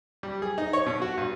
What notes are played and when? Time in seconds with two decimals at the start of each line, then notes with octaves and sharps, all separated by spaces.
0.23 G3
0.42 G#4
0.58 D#4
0.73 C#5
0.86 B2
1.02 F#4
1.18 G2